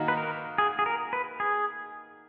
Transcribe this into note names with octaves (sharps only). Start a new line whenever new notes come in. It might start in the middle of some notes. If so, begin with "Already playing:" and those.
Already playing: D#3 A#3 D#4 F#4
B4
A#4
G#4
G#4
A#4
B4
G#4